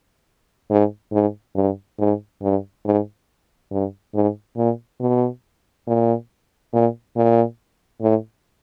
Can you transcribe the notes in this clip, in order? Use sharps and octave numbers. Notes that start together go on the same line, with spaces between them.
G#2
G#2
G2
G#2
G2
G#2
G2
G#2
A#2
B2
A#2
A#2
A#2
A2